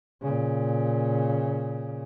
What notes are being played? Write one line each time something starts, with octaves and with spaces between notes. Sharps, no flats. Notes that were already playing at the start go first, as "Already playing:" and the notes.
A#2 C#3